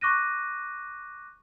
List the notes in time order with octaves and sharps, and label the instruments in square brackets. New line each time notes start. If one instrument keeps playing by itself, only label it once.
[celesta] C#6 D6 F#6 A#6 D#7